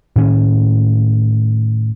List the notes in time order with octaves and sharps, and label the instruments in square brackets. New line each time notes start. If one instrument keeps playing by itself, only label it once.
[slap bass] A2 D#3 C#4